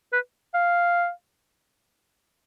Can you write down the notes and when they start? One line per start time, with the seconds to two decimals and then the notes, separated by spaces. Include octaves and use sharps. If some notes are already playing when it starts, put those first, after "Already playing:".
0.13 B4
0.54 F5